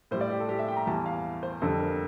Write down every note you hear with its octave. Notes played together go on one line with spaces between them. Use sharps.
A2 G3 C5
D5
G4
A4
G4
E5
G5
A#5
E2 E3 G3 A5
F5
C5
F2 D3 G3 A4
A#4